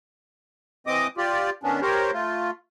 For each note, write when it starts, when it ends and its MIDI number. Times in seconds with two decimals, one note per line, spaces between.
0.87 1.07 52
0.87 1.07 60
0.87 1.07 75
0.87 1.07 86
0.87 1.07 87
1.17 1.50 65
1.17 1.50 67
1.17 1.50 74
1.63 1.81 51
1.63 1.81 59
1.63 1.81 61
1.63 1.81 62
1.82 2.11 67
1.82 2.11 70
1.82 2.11 72
1.82 2.11 73
2.13 2.51 57
2.13 2.51 65